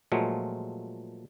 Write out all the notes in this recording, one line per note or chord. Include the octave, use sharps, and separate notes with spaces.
A#2 F3 F#3 G#3 A3